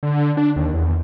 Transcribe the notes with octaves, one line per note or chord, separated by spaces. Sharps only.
D3
D4
D#2
E2